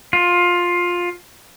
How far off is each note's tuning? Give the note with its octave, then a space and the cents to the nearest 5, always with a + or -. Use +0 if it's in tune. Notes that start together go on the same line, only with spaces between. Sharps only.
F4 +15